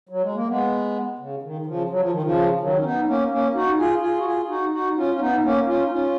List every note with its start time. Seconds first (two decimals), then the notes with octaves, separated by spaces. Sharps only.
0.09 F#3
0.22 G#3
0.35 A#3
0.48 G#3 B3
1.19 C#3
1.43 D#3
1.61 D#3
1.66 C#3 F3
1.90 F#3
2.00 F3
2.11 D#3
2.22 C#3 F3
2.61 D#3 F#3
2.78 C#4
2.84 B3 D#4
3.07 A#3 C#4
3.31 A#3 C#4
3.54 D#4 F#4
3.78 F4 G#4
4.02 F4 G#4
4.18 F#4
4.25 F4 G#4
4.49 D#4 F#4
4.72 D#4 F#4
4.96 C#4 F4
5.14 C#4
5.20 B3 D#4
5.43 A#3 C#4
5.67 C#4 F4
5.86 D#4
5.90 C#4 F4